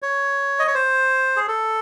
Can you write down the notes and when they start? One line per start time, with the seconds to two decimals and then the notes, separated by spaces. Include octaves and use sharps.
0.02 C#5
0.59 D#5
0.67 C#5
0.75 C5
1.36 G#4
1.48 A4